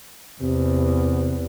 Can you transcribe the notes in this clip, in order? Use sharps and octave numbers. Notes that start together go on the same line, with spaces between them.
E2 C3